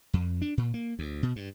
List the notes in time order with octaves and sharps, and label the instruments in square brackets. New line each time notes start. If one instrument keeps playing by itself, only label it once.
[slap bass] F2
D4
A#2
A#3
D2
B2
G2